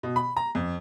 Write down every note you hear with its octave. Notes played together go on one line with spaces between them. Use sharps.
B2
B5
A#5
F2